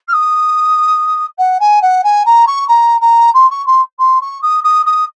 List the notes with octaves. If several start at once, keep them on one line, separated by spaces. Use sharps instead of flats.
F6
D#6
F#5
G#5
F#5
G#5
A#5
C#6
A#5
A#5
C6
C#6
C6
C6
C#6
D#6
D#6
D#6